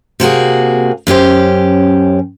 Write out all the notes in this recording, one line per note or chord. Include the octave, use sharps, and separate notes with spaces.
C3 A#3 F#4 G#4
F#2 C#4 G4 C5